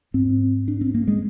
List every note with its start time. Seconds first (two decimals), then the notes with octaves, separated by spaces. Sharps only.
0.14 G#2 C4
0.68 D4
0.81 C4
0.95 A#3
1.07 G#3